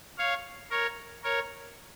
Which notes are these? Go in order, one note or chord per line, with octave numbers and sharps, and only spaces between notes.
C#5 F5
A#4 C#5
A#4 C#5